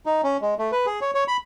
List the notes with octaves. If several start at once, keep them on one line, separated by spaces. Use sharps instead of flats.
D#4
C#4
G#3
A3
B4
G#4
C#5
C#5
B5